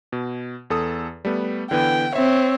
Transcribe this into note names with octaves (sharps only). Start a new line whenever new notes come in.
B2
E2 A4 D#6
G3 A3 B3
D3 E3 B3 G5
C4 C#5 E5